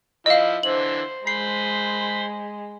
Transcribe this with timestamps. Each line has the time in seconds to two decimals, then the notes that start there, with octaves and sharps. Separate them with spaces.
0.26 F3 E4 D#5 F5
0.63 D3 E3 C5 F#7
1.27 G#3 C5 B5 C7